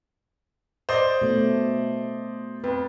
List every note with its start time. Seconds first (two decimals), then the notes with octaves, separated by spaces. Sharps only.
0.89 C5 D5 D#5
1.22 B2 A3
2.64 F2 B4